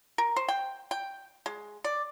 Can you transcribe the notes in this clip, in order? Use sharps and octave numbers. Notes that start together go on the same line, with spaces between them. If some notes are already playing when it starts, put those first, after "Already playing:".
A#4
C5
G5
G5
G#3
D5